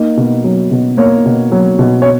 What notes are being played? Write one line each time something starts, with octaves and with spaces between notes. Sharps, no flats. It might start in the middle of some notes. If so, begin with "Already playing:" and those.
Already playing: A#3 D#4
B2
F#3
B2
A#3 C#5
B2
F#3
B2
C#5